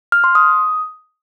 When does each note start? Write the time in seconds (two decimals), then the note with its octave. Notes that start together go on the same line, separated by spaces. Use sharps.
0.12 F6
0.24 C6
0.35 D#6